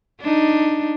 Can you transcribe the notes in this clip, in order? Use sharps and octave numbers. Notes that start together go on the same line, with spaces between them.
D4 D#4